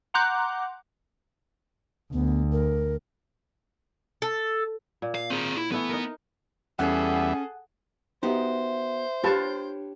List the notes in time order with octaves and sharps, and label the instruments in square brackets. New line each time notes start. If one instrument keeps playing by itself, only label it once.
[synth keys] F#5 A#5 C6 D6 F#6 G6
[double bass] D2 [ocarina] B3
[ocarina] A#4
[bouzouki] A4
[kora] A#2
[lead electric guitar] F5
C4 G#4
E4
[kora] E3 A3 B4 [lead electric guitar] B3
[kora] D#4 A#4
[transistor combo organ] E2 G3 E5 [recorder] C#4 [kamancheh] G#4 A4 [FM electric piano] F#5
[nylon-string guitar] B3 F#4 G4 [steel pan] D#4 [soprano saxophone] C5 [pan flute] E5
[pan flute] D4 [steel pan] F4 B4 A5 [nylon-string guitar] G4 C#5